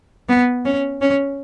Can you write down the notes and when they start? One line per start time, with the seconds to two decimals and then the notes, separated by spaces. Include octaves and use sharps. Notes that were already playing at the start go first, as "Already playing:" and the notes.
0.29 B3
0.65 C#4
1.01 C#4